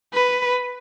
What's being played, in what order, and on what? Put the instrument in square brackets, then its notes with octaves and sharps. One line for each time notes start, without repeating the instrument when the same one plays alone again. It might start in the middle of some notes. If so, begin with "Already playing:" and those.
[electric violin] B4